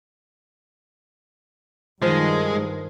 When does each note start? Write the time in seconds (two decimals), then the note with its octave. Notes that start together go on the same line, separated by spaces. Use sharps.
2.02 G2 D#3 F3 G#3